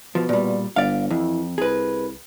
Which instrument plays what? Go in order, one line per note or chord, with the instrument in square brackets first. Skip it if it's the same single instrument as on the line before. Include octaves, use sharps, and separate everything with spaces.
[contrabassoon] B2 [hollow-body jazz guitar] F3
[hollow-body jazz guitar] A#2 G3
[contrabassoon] G1 [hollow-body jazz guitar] D5 F5
[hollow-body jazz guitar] F2 [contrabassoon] E3
[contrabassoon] C2 [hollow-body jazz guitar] G#4 B4